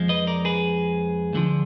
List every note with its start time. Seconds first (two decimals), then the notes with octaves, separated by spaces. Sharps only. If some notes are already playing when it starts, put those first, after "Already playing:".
Already playing: F2 F3 G#3
0.09 B4 D#5
0.27 A#4 D5
0.45 G#4 B4
1.33 D2 D3 F3